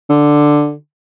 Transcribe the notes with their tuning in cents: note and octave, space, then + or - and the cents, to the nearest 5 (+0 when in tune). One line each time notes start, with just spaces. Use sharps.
D3 +5